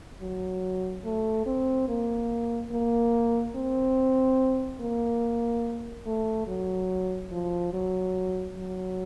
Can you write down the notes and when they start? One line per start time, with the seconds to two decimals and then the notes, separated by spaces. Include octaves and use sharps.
0.21 F#3
1.05 A3
1.46 C4
1.88 A#3
2.72 A#3
3.56 C4
4.80 A#3
6.06 A3
6.47 F#3
7.31 F3
7.73 F#3
8.57 F#3